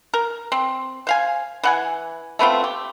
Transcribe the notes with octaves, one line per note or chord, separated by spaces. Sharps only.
A#4
C4
C5 F5 G#5
E3 F#5 G#5
A3 B3 C4 F4
G4